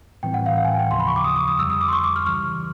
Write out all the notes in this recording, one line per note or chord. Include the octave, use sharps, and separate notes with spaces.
A2 E3 G3 C4 G5
F#5
F5
F5
G#5
G5
G5
D#2 C#3 F3 C6
B5
C#6
D6
D#6
D6
D#6
F2 D3 G3 E6
D#6
D6
C6
C#6
D6
F6
C#2 C#3 E3 G3 F6